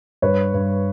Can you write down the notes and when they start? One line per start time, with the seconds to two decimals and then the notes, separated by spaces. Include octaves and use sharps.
0.22 G2 B4 C#5
0.54 G2